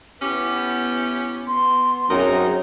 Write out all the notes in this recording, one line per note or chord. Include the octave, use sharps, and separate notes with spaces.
B3 C#4 E4 G4
B3 C6
F#2 F#3 C4 D#4 G#4 A#4 G5